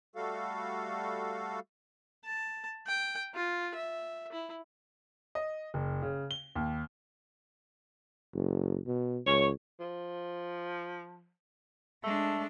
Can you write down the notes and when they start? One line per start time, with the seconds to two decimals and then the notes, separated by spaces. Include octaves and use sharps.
0.15 G3 A3 F#4 A4 F5
2.25 A5
2.87 G5
3.35 F4
3.75 E5
4.32 E4
5.35 D#5
5.74 F#1
6.02 C#3
6.31 G7
6.56 D#2
8.34 F#1
8.87 B2
9.26 C#2 C#5
9.79 F3
12.03 G#3 A3 D4